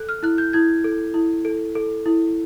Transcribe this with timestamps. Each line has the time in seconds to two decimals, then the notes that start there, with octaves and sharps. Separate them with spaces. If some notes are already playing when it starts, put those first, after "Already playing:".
Already playing: A4 F#6
0.09 F6
0.23 E4 F#6
0.38 G6
0.53 E4 G#6
0.84 A4
1.14 E4
1.45 A4
1.75 A4
2.06 E4